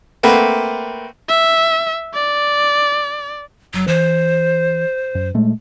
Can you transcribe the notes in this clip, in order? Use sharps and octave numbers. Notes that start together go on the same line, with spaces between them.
A3 A#3 C4 B4 F#5
E5
D5
F#1 F#3
E3 C5
F#2
A#2 G#3 A3